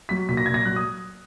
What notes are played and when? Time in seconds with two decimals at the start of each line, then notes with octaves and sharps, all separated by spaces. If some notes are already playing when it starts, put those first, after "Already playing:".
0.09 F#3 B6
0.29 A#2 B6
0.37 A#6
0.46 A#2 G#6
0.54 A#6
0.65 F#3 F#6
0.76 D#6